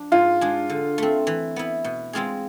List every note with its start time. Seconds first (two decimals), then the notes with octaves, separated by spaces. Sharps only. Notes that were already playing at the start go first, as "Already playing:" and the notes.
Already playing: F3 D4
0.12 G#2 F4
0.41 G#3 D4 G#4
0.70 D3
0.98 A3 C4
1.27 E3
1.56 B3 E4
1.84 B2
2.13 G#3 C4 F4 G#4